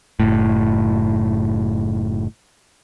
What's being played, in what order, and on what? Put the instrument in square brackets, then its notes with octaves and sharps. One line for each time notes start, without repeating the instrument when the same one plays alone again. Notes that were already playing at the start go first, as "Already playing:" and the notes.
[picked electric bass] F#1 A2